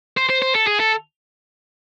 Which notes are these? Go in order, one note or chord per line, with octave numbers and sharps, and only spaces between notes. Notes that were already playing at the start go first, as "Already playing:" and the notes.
C5
C5
C5
A4
G#4
A4